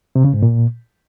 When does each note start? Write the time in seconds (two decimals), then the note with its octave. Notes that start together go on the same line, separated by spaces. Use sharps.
0.15 C3
0.24 C#3
0.33 G#2
0.42 A#2